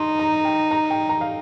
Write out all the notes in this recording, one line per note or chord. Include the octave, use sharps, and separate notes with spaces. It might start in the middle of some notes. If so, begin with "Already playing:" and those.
Already playing: D#4 C6
A#5
G5
A#5
G5
A#5
F5